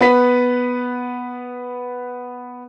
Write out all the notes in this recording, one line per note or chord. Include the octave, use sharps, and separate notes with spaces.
B3 B4 B6